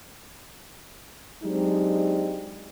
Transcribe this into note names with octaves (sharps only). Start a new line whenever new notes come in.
F#3 G#3 C4 D4 D#4 G4